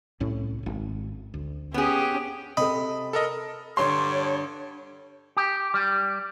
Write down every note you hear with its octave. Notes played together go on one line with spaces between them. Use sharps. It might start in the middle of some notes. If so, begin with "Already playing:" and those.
C2 A2 C#4
D#1 G#1
D2
B3 C#4 G4 G#4
C3 C4 A4 D#5 B5
A4 A#4 D#5
G2 D3 C#5 C6
G4
G3